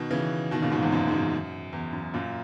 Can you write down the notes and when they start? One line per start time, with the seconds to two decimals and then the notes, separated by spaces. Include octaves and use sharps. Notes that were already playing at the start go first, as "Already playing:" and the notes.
Already playing: B2 D#3
0.11 C#3 E3
0.51 B2 D#3
0.62 A#2 C#3
0.71 G#2 B2
0.82 E2 G#2
0.92 F#2
1.08 G#2
1.12 F#2
1.73 E2
1.93 F#2
2.14 F#2 A#2